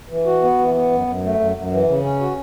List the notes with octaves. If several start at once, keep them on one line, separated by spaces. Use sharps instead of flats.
E3
F#4
B3
E3
B3
F#2
F#2
A3
F#2
F#2
E3
C#3
C#4
F#4